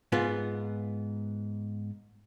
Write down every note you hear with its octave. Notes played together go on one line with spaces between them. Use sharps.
G#2 B3 F4